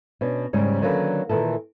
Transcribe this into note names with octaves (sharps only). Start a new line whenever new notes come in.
B2 C#4 D4
D#2 G#2 C#3 G3 C#4
D3 D#3 F#3 A#3 C#4 B4
A#2 D#3 E3 A4